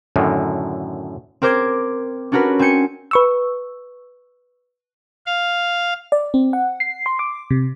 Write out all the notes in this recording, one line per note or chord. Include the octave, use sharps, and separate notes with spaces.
F#2 A2 D3 D#3
C4 A#4 C5 D6 G#6
C#4 D4 F#4 A#4 B4
C4 G#5 G6 C#7
B4 C#6 E6
F5
D5
C4
F#5
C7
C6
D6
C3